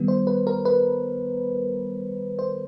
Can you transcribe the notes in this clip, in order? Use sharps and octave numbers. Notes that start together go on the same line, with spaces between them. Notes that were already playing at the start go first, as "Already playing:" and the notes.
Already playing: D#3 G3 B3
C5
B4
A#4
B4
C5